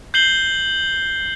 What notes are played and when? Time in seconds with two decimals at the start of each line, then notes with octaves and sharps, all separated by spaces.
0.14 G6 C7 F#7 G7